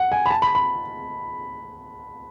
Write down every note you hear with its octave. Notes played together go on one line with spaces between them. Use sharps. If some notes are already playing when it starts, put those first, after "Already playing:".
Already playing: F#5
G#5
B5
A5
B5
B5